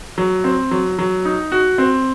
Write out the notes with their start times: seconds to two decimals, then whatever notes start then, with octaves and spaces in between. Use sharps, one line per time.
0.18 F#3
0.44 C4
0.71 F#3
0.99 F#3
1.25 D#4
1.52 F#4
1.78 C4